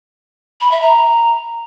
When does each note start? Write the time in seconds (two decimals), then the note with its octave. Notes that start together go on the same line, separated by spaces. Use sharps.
0.61 B5
0.71 E5
0.82 A#5